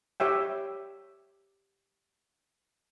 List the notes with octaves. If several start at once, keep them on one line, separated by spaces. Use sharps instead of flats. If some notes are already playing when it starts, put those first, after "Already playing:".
G4 C#5 E5 G5